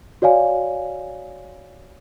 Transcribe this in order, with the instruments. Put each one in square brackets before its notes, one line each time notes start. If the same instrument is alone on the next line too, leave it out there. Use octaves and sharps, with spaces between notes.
[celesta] F#4 C#5 D5 F5 G#5